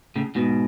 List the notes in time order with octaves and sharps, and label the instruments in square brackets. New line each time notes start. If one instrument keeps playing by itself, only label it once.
[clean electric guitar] A2 C#3
G#2 B2